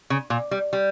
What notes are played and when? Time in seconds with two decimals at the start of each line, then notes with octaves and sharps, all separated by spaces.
0.10 C#3
0.30 A#2
0.51 G3
0.73 G3